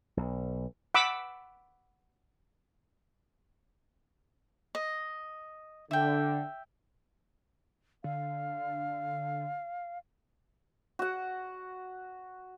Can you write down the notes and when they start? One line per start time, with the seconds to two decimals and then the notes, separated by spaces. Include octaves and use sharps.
0.17 B1
0.94 F#5 B5 D6 E6
4.75 D#5
5.91 D3 E5 G5
8.04 D3 F5
10.99 F#4 F#5